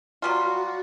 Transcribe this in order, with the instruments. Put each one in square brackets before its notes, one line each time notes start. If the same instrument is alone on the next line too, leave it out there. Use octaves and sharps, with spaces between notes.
[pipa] F#3 G3 F4 [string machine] F#4